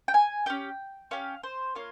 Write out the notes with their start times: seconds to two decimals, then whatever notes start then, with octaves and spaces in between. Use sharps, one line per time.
0.08 G5
0.14 G#5
0.46 C#4 G4 G5
1.11 C#4 G4 F5
1.43 C5
1.75 A#3 F4 C#5